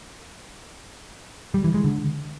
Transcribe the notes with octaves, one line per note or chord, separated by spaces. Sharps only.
G3
E3
G#3
D3